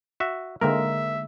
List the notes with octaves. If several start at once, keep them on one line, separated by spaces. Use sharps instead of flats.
F#4 E5
D3 G#3 A#3 A#4 E5